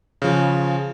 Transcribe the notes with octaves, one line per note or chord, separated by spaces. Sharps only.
C#3 F3